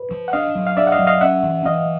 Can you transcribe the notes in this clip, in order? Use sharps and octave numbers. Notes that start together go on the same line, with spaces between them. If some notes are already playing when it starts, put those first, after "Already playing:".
Already playing: B4
F3
F#5
D4 D#5 F5
F#3
F5
D4 D5 E5
F#5
D#5 F5
F#3
D#5 F5
C#4 E5 F#5
E3
E3 D#5 F5